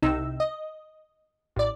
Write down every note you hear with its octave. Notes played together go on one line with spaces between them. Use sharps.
C2 C3 D#4 E6
D#5
A1 D5